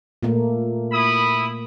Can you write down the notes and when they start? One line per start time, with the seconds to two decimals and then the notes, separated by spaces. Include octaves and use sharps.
0.23 A#2 A3 A#3
0.92 E4 B5 D#6